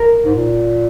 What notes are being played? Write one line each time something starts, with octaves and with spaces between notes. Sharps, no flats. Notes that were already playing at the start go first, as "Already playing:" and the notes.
Already playing: A#4
G#2
A#2